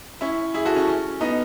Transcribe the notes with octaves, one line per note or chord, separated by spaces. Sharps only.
C#4 E4
E4 G#4
F#4 A4
C#4
C#4
B3 D#4